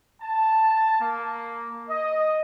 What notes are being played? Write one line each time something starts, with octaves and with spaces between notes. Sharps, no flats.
A5
A#3
D#5